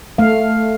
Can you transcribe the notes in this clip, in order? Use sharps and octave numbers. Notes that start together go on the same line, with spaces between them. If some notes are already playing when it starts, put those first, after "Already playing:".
A3 F5